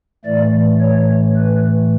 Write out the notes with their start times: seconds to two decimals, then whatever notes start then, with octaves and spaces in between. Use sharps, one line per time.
0.25 A2 E3 A3 D5
0.80 C#5
1.36 B4